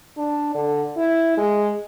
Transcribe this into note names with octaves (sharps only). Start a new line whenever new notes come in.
D4
D3
E4
G#3